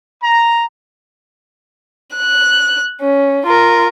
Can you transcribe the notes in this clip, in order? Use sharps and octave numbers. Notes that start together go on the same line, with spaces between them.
A#5
F#6
C#4
F4 A#4